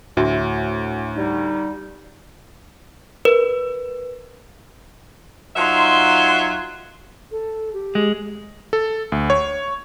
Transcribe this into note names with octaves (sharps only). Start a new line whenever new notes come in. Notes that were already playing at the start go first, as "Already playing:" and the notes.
D2 A2 D4 F#4 E5
G3 D#4
A#4 B4
F#3 D#4 F4 E5 C6
A4
G4
G#3
A4
D2
C#5